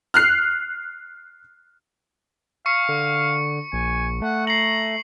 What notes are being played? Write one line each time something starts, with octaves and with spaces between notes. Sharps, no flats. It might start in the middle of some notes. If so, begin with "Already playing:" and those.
F6 F#6 C7
F5 C#6 C#7
D3
A#1 G#5
A3 F#5
A#5 C7 F#7